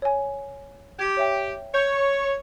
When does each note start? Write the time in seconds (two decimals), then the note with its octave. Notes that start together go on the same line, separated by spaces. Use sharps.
0.02 C#5 G#5
0.99 G4 G#6
1.17 C#5 E5 G5
1.74 C#5 G6